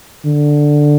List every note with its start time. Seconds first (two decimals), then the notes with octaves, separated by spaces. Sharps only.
0.26 D3